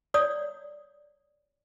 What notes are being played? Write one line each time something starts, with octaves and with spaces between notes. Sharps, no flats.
C#5 D5 D#6